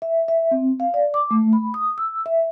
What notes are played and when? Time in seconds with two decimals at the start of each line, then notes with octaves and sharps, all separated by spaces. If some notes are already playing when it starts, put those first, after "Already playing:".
0.02 E5
0.28 E5
0.51 C4
0.80 F5
0.94 D5
1.14 D6
1.31 A3
1.53 B5
1.74 D#6
1.98 E6
2.26 E5